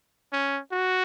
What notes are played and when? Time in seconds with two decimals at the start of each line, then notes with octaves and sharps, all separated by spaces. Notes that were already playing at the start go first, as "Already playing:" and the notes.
0.33 C#4
0.72 F#4